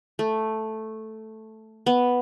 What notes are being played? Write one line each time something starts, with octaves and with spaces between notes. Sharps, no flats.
A3
B3